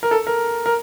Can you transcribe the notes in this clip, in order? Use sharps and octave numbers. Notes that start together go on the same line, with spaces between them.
A#4
A4
A#4
A#4